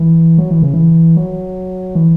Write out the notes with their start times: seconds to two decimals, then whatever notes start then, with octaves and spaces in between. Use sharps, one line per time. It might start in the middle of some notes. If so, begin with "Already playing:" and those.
Already playing: E3
0.38 F#3
0.51 E3
0.62 C#3
0.74 E3
1.17 F#3
1.95 E3